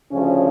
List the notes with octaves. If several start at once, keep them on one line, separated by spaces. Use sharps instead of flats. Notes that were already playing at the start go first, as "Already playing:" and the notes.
D2 C#3 F3 C#4